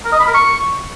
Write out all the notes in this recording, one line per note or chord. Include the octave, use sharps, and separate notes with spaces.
A#4
D#5
B5
A#4
C#6